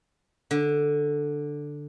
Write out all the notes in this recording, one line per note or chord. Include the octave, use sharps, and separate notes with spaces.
D3